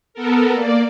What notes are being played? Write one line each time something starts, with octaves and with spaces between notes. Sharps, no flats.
B3 A4 A#4
A#3 D5